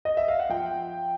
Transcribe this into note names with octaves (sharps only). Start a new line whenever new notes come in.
D#5
E5
F5
F#5
F3 G5